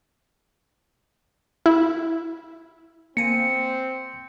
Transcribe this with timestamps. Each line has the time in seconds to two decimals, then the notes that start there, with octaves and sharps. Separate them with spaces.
1.66 E4
3.17 A#3 C4 G#5 C#7